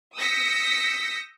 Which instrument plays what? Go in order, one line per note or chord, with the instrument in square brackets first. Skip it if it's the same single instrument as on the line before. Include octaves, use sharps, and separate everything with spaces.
[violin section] D#6 E6 G6 A#6 B6 C#7